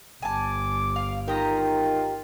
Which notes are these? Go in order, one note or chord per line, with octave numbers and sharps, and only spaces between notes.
G1 G#5 A5 D6
F5
D#3 F4 G4 D#5 A#5